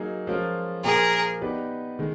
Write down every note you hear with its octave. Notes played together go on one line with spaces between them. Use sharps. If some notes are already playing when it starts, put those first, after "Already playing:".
Already playing: F#3 A#3 D#4 G#4
F3 G#3 C#4 F4 A#4
A#2 F3 A#3 G#4 A#4
B3 D#4 G4 B4 D5
D#3 G#3